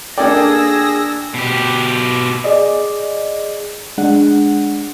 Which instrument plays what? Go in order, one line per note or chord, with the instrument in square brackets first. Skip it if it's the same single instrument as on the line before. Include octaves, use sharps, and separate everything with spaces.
[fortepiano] A#3 D5 [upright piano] D4 A4 G5 [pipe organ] G#4 [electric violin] E6 A#6
[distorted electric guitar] B2 G4
[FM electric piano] G#4 D5 D#5
G#3 D4 F#5